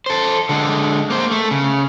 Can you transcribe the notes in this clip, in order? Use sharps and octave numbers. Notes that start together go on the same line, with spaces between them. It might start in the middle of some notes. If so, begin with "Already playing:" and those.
A4 C5
D3 G#3
A#3 C5
A3
C#3